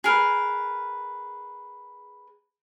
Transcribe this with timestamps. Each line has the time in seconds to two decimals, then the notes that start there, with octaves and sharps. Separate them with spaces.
0.04 G#4 A#4 B4